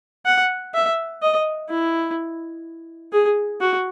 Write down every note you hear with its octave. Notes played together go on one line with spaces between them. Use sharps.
F#5
E5
D#5
E4
G#4
F#4